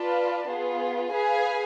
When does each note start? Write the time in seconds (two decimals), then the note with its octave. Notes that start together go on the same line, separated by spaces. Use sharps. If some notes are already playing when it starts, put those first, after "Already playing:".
Already playing: F4 B4 D5 A5
0.49 B3 F4 G#4
1.12 G#4 B4 F5 G#5